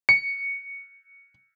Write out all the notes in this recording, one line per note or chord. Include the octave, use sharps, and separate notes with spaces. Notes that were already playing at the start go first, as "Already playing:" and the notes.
C#7